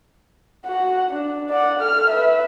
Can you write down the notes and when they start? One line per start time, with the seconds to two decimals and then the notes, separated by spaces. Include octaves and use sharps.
0.65 F#4 F#5
1.10 D4
1.49 D5 F#5
1.80 A4 F6
2.10 B4 E5